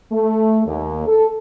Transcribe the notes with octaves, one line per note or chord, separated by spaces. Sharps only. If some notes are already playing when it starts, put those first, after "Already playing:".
A3
D#2
A4